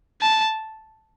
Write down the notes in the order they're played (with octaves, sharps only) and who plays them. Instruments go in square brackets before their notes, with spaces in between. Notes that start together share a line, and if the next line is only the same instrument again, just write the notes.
[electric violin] A5